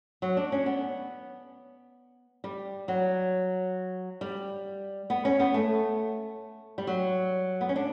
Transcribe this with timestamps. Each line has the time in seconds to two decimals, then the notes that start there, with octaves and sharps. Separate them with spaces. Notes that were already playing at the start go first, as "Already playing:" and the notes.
0.22 F#3
0.37 D4
0.52 C#4
0.66 B3
2.44 G3
2.88 F#3
4.21 G3
5.10 B3
5.25 C#4
5.39 B3
5.54 A3
6.78 G3
6.87 F#3
7.61 B3
7.69 C#4
7.76 D4